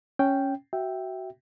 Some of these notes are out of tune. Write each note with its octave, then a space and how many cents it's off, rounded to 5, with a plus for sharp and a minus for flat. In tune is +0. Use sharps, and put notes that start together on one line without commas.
C#4 +0 G5 +0
F#4 +20 E5 +0 G5 +0